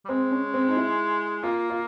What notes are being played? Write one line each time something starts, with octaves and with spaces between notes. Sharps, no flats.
G3
G#3 C4
C#4
C4
D#4
E4
A#3 F4
F4